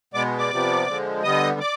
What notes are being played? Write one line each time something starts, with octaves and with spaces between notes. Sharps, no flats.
B2 G#3 B3 D5 D6
D5 D6
C3 F3 B3
D3 F3 G#3
D3 G3 B3 D#5 D#6
D5 D6